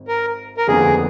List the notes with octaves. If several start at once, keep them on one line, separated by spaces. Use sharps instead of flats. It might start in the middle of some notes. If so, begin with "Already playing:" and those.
Already playing: G#1
A#4
A#4
F1 D#2 D3 F3 B3 G#4